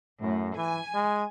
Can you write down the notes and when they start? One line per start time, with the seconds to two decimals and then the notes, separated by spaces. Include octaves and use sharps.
0.22 F#2 A2
0.57 E3 G#5
0.94 G#3